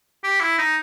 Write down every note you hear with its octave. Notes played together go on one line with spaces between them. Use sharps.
G4
E4
D#4